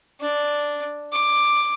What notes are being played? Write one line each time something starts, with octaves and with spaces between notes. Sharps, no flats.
D4
D6